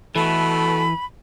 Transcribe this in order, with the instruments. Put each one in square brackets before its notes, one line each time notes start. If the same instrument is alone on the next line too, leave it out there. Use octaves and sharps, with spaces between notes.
[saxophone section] B2 A3 [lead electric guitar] E3 [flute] B5